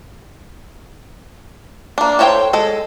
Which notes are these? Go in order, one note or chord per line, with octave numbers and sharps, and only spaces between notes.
A#3 D4
A4 C5 C#5 E5 G5
G#3 A4